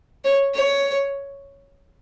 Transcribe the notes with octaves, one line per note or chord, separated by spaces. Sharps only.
C#5
C#5